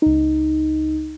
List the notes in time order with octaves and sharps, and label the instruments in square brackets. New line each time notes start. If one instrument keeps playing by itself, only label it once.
[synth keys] C#2 D#4